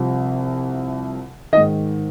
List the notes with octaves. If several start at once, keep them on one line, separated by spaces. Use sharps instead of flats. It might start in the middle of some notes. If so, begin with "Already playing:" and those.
Already playing: C2 C3 F3
G#2 D#3 D#5